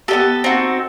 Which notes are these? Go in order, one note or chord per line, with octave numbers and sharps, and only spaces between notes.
B3 D#4 G4 A4
C4 D#4 F#4